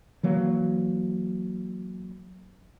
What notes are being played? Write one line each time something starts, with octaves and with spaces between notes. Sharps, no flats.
E3 F#3 A#3